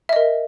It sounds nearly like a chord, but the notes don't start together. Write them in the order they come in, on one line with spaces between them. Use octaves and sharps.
E5 D#5 A#4